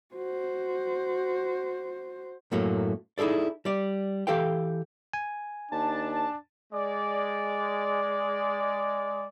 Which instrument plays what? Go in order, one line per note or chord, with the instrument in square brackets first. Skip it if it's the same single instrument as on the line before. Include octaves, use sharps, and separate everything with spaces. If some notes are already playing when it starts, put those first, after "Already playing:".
[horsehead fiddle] F#4 C5
[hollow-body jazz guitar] F#2 A2 F#3 A3 A#3
D#4 E4 G#4 A4 D5
G3 D5
E3 G4 A4 F5 G5
[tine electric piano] G#5
[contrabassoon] D#2 [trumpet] D4 [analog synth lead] A5
[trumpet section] G#3 D5